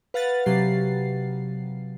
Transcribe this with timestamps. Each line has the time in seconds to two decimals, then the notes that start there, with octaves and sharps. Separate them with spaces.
0.14 B4 F5 F#5 A6
0.46 C3 F#3 G4 C7